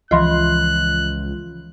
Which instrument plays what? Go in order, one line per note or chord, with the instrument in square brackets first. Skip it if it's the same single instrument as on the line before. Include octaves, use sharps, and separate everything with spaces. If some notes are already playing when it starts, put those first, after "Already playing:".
[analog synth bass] C#2 [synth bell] E3 F3 F4 [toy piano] D#5 C6 [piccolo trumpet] F#6